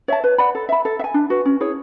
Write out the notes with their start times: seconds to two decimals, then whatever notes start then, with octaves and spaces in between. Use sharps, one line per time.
0.08 C#5 E5 A5
0.24 B4
0.38 D5 F#5 B5
0.55 A4
0.69 E5 B5
0.85 A4
0.99 E5
1.04 G#5
1.14 D4
1.30 F#4 B4
1.45 C#4
1.61 E4 G#4 C#5